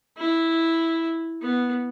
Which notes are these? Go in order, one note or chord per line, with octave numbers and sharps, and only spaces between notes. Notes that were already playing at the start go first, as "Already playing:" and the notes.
E4
B3